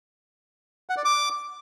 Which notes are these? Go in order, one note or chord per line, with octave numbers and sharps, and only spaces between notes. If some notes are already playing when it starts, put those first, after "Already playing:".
F#5
D5
D6